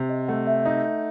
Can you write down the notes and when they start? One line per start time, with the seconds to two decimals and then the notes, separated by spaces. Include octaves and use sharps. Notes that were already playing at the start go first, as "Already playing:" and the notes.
Already playing: C3
0.09 D#5
0.28 A3 F#5
0.47 E5
0.65 D#4